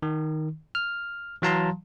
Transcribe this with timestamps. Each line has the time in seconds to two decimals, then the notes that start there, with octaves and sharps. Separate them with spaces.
0.02 D#3
0.75 F6
1.42 E3 F#3 F5 A5 A#5 C6